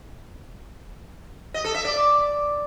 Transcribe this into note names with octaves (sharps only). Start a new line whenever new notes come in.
D#5
A4
E5
D5